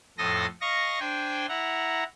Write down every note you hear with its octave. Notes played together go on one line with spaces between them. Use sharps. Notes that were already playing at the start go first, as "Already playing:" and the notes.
F2 A2 A4 C6 D#6 A#6
D#5 F5 C#6 A#6
D4 C5 G5 G#5
E4 F#5 A#5